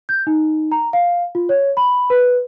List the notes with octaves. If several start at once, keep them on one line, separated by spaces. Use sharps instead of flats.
G6
D#4
A#5
F5
F4
C#5
B5
B4